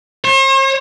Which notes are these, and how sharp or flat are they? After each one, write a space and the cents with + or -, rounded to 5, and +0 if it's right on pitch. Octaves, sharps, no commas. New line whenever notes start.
C5 +45